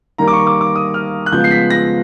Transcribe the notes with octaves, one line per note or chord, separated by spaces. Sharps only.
D#3 G3 A#3 A#5
D6
C#6
D6
D6
D#6
F6
F#6
C#3 F3 G#3 B3 G6
C7
B6
A#6